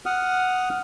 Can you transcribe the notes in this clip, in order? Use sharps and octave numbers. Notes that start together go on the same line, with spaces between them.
F#5 D#6 F6